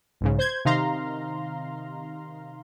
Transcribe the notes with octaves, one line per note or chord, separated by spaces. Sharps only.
B1 G#2 C#3
C5 G6 G#6
C3 D#3 D#4 F5 A#5 C6